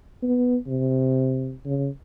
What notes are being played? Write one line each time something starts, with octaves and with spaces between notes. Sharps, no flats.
B3
C3
C#3